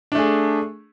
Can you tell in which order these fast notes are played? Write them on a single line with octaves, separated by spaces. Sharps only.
D4 A3 G#4